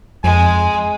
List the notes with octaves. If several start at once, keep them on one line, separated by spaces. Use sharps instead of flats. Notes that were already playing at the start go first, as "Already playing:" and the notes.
F2 G#3 G#5